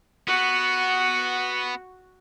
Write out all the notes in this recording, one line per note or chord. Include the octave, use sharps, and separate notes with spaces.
B3 F#4